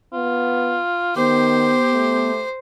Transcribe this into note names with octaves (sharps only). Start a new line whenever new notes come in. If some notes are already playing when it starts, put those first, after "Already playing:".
B3 F4
D#3 B3 G4 C5
A3